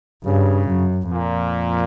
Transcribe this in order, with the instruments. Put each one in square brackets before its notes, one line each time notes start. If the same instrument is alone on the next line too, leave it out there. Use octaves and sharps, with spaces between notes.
[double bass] G2 [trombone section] C#3
[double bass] F#2
[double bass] F2 [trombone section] A#2